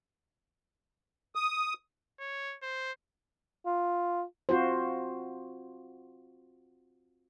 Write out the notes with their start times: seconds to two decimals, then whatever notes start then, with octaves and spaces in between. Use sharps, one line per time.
1.35 D#6
2.20 C#5
2.63 C5
3.66 F4
4.49 C4 F4 F#4 C5